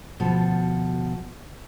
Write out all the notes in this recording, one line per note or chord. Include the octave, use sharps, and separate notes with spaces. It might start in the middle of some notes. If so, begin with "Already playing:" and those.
D2 B2 F3 A4